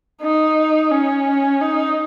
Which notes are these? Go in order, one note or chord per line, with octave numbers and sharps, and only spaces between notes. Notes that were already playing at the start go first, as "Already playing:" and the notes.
D#4
C#4
D#4